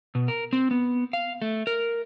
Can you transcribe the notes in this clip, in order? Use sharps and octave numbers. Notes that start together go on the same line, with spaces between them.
B2
A#4
C4
B3
F5
A3
A#4